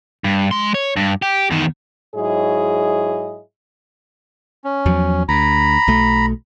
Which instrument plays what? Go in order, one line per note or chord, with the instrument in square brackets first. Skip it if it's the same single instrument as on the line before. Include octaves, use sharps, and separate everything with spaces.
[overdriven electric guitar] G2
G#3 C6
C#5
G2
G4
E2 D#3
[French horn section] G#2 F#3 E4 G#4 C#5 D#5
[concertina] C#4
[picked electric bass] E2 F3 F#3
[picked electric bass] D2 [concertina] A#5 B5
[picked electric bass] B1 B2 A3